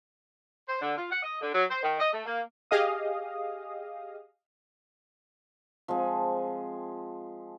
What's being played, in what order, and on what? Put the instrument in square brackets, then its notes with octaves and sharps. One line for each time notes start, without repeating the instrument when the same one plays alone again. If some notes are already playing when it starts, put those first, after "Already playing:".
[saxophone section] C5
D3
F4
F#5
D#5
D3
F#3
C5
D#3
D#5
A3
A#3
[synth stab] G4 G#4 D#5 F5 D#6
[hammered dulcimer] F3 G#3 C4 G#4